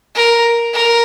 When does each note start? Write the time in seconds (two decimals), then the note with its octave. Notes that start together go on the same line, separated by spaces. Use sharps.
0.15 A#4
0.73 A#4